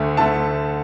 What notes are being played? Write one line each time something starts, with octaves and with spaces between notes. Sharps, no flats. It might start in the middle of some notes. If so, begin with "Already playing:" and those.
Already playing: D2 D3 A3
D2 D3 A3 A5